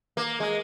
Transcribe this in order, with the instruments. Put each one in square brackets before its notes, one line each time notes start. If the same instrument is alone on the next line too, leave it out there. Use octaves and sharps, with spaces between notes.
[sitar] A#3
G#3